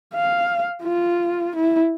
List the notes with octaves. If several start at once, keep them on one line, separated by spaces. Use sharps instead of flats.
F5
F4
E4